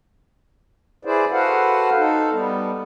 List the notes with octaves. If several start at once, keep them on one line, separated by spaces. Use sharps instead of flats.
E4 G#4 B4 C5 D5
F#4 A4 B4 C5 F5 F#5
D#4 A4
G3 B3